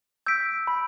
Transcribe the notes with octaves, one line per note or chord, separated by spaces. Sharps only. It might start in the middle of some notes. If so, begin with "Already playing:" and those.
E6 G6 B6 D7
B5